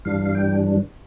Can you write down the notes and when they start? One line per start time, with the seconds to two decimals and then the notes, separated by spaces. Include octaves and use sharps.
0.05 G2 E3 G3 D4 F5
0.25 F5
0.35 G5